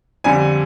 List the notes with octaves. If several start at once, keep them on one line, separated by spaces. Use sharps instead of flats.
F2 D3 G3 G#5